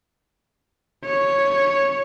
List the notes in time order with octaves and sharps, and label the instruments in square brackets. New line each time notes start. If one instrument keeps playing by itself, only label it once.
[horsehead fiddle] C#5